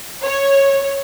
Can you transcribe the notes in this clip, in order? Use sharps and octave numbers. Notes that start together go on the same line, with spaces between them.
C#5